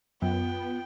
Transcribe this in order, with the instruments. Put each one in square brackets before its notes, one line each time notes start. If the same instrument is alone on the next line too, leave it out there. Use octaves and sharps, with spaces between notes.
[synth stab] F#2 [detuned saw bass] B3 [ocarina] F4 [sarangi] G5